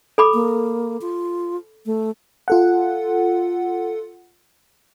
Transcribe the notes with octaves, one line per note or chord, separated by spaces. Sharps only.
A4 B5 D6
A#3
F4
A3
F4 A4 F#5